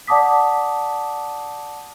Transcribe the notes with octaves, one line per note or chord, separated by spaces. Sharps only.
D5 F#5 A5 D6 D#6 B6